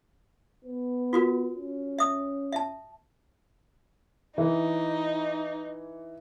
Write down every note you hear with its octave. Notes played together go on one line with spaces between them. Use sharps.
B3
F4 F#4 A#4
C#4
E5 D#6
E5 A5
E3 D#4